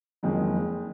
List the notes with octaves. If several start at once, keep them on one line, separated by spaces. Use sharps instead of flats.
F#1 F2 D#3 G#3